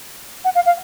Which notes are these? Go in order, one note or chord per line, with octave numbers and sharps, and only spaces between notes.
F#5
F5
F5